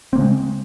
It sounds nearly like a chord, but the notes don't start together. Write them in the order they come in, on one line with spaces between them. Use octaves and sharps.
C4 A#3 C#3 G#3